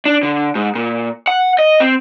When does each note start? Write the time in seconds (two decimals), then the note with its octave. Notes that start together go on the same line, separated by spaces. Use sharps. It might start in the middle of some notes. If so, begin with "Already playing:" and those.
0.05 D4
0.23 D3
0.55 G#2
0.75 A#2
1.27 F#5
1.59 D#5
1.80 C4